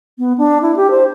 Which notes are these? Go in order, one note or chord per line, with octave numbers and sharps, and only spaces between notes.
B3
D4
E4
G4
C5